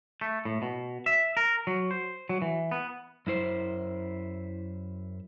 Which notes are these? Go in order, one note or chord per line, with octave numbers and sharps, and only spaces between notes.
A3
A2
B2
E5
A#4
F#3
C5
F#3
E3
B3
F#2 E4 C5